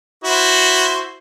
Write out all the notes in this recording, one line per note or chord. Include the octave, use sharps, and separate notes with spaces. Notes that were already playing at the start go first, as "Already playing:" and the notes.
E4 F#4 C5